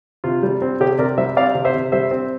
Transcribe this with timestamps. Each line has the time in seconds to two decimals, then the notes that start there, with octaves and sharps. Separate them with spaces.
0.24 C3 F4
0.43 G3
0.62 C4
0.80 C3 G4
0.98 C3 A#4 D5
1.18 G3 C5 E5
1.37 C4 D5 F5
1.55 C3
1.65 C5 E5
1.74 C3
1.92 G3 C5 E5
2.11 C4